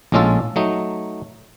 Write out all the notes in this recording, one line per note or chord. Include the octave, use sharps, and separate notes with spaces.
A#1 A2 G#3 C#4 F4 A4
F#3 A3 D#4